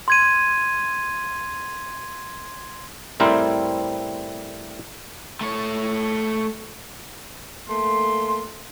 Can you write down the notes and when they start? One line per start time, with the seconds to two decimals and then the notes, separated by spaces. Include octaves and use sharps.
0.08 C6 G#6 D#7
3.20 A2 G3 C4 E4 A#4 C5
5.41 A3 C#5
7.68 A3 A#3 C6